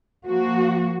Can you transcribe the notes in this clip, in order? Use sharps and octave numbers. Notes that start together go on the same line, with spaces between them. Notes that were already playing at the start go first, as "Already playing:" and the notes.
F3 A#3 F#4